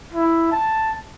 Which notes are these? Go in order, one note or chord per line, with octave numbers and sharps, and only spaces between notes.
E4
A5